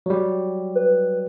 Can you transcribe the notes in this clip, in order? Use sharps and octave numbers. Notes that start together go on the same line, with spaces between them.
F#3 G3
B4